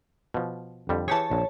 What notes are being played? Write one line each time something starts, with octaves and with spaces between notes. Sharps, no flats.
B2 F3
F2 D3 G3
E3 G4 G#4 C#5 A5
A#1